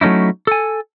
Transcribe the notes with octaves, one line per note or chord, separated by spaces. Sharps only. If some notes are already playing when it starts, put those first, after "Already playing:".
F#3 A3 C#4 D#4 E4
A4 G#5